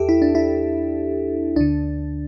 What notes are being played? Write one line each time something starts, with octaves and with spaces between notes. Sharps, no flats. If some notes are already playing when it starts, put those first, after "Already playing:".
Already playing: E2 G4 A4 E5
E4
D4
E4
D2 D3 D4